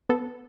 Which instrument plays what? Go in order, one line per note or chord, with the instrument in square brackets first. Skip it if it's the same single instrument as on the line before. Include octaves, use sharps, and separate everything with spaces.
[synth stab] B3 A4